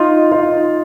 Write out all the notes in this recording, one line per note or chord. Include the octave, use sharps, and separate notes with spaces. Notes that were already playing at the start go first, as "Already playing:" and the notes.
Already playing: D#4 F4
D#4 F4